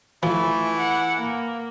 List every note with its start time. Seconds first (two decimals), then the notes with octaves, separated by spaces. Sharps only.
0.23 E3 F3 A3
0.79 F#5
1.18 A#3